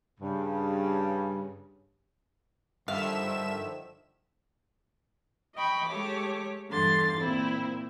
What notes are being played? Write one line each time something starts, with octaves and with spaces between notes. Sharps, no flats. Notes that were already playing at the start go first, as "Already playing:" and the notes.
G2 C#3
G2 D3 D#3 F3 E5 F5 E7
D#5 G5 B5 C#6
G#3 A3 G4 C#5 D6
E2 G2 D3 C6 A6
A#2 C4 E4